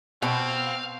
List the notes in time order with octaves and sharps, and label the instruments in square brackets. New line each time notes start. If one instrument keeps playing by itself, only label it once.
[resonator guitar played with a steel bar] B2 [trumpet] C4 [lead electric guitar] F5